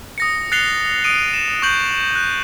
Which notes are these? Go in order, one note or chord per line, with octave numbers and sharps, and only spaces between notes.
D#6 A#6 C#7
F#6 A6 C7 C#7 F7 G7
D#6 D7 D#7 F7
E7
C#6 D#6 G6 F#7
F#6